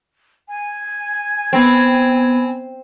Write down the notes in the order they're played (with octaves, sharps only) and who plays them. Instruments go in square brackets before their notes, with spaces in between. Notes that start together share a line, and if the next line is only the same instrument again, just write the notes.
[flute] G#5
[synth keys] B3 B5 G#6 [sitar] C4